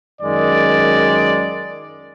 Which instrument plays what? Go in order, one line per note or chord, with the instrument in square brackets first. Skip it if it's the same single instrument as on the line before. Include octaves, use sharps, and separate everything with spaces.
[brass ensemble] F#2 D#3 G#3 D5